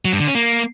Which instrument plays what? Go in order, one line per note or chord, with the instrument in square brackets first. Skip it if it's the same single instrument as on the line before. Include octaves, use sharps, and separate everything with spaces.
[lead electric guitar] F#3
G2
D3
C#4
A#3